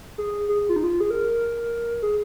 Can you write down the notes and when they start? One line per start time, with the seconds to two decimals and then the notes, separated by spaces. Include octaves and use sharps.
0.18 G#4
0.49 G#4
0.69 F4
0.76 D#4
0.84 F4
1.00 G#4
1.11 A#4
2.02 G#4